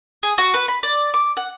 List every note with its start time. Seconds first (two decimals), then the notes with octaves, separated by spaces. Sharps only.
0.23 G#4
0.38 F#4
0.54 B4
0.68 B5
0.83 D5
1.14 D6
1.37 F#5